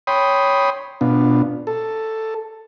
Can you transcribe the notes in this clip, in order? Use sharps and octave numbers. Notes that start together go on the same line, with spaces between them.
C#5 G5 B5 C6 D#6
B2 B3 D4 F4
A4